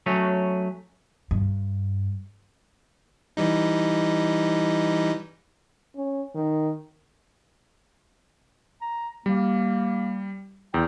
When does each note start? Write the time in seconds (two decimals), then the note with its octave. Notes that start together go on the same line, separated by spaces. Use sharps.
0.06 F#3 A3 C#4
1.31 G2
3.37 E3 G3 D#4
5.96 C#4
6.35 D#3
8.81 A#5
9.26 G3 A#3
10.74 E2 G5